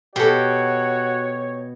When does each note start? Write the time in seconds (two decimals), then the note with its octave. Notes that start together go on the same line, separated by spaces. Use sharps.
0.16 B2 F#4 G4 A4 C#5